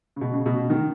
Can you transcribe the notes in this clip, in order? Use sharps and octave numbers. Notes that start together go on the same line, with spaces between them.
C#3
B2
C#3
B2
D#3